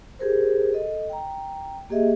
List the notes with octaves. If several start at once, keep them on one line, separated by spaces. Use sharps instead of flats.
G4 G#4 A#4 C5
A4 D#5
G5 A#5
A#3 G4 G#4 D#5 E5